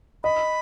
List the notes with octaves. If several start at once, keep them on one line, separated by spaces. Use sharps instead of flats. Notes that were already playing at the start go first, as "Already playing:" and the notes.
D#5 B5